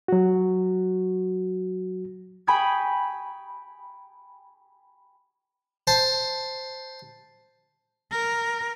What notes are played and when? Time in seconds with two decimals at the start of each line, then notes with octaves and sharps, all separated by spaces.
0.08 F#3 F#4
2.47 G5 G#5 B5 C#6 D#6 G#6
5.87 C5 A5
8.11 A#4